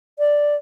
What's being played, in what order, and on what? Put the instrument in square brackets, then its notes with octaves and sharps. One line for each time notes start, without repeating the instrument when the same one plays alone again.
[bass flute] D5